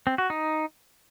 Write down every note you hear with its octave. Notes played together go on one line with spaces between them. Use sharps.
C4
F#4
D#4